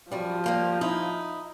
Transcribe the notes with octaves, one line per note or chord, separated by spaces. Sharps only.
F#2 F3 G3
G3 A#3 G4
D#4 E4